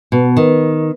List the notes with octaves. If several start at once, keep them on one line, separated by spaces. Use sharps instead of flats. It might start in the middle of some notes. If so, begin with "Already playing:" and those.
B2
D#3